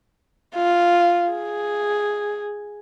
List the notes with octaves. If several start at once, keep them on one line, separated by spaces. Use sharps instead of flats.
F4
G#4